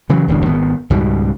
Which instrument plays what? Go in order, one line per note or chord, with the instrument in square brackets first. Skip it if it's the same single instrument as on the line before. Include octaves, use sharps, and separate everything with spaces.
[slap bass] C#3 E3 F#3
D1 G1 E2 D4
G#1 D#3 B3
C#2 G#2 B2 G3